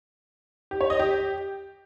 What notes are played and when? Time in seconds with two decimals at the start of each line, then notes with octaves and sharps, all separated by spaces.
0.71 G4
0.81 C#5
0.90 D#5
0.99 G4